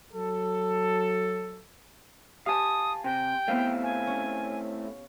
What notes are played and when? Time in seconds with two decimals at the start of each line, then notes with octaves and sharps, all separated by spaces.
0.12 F#3 A4
2.46 G4 F5 G#5 A5 D#6
3.04 C3 G5
3.48 A3 B3 C4 E4 F5
3.83 G#5
4.07 C#4